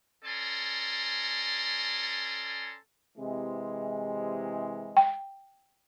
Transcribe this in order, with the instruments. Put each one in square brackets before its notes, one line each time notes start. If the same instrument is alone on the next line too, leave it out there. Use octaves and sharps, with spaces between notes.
[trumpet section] C#4 A4 D5 G#5 A#5 C6
[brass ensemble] C3 E3 G#3
[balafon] G5